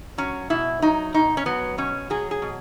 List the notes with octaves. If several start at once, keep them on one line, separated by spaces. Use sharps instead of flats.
F#3 C#4
B2 E4
F#3 D#4
B2 D#4
C#4
F#3 B3
B2 C#4
F#3 G#4
G#4
B2